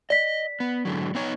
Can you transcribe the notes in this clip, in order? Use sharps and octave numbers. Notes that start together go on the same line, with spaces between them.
D5 D#5 B6
B3
G#2 D3 F#3
B3 D#4 C#5